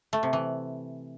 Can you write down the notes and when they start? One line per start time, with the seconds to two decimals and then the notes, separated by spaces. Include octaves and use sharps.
0.13 A3
0.23 C3
0.33 E3